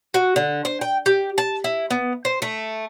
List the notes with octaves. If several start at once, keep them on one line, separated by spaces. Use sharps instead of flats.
F#4
D3
C5
G5
G4
A5
E4
B3
C5
A3